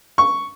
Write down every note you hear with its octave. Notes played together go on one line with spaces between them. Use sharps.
C#6